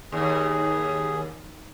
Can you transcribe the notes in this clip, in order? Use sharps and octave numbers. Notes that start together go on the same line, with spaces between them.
D#2 G#4